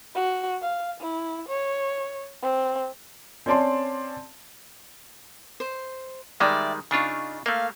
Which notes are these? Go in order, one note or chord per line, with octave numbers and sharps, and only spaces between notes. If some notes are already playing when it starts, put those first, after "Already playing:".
F#4
F5
E4
C#5
C4
C4 C#4 D5 A5 C6
C5
D#3 G3 G#3 D5 E5 G5
C#3 D4 D#4 F4 C#6
A3 A#3 F5